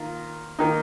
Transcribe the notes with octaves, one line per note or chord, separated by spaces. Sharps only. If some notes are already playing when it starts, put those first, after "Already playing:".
Already playing: D#3 A#3 F4
D#3 A#3 D#4